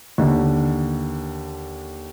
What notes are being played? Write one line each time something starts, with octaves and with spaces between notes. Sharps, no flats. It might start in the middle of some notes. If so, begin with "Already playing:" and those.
D#2 D3